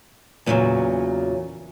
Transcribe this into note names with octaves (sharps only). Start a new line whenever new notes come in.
E2 A#2 C#3 F3 F#3